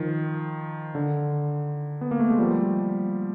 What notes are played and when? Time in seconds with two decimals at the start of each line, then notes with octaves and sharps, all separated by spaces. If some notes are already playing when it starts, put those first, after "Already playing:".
Already playing: D#3 F3
0.95 D3
2.01 B3
2.11 A#3
2.20 A3
2.30 G#3
2.38 F3 G3